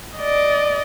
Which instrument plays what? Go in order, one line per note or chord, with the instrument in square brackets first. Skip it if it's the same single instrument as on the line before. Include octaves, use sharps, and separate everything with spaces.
[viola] D5 D#5